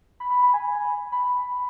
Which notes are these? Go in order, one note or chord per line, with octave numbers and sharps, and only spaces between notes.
B5
B5
B5
G#5
B5